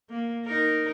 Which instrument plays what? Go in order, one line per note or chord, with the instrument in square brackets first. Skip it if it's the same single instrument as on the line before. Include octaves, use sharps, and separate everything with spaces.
[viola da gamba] A#3
D#4 A#4